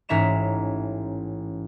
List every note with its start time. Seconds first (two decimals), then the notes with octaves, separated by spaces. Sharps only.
0.09 A1 G#2 C#4 E5 A#5 E7